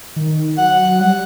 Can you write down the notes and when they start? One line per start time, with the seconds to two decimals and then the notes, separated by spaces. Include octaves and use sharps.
0.16 D#3
0.58 F#3 F#5
0.99 G3 F#5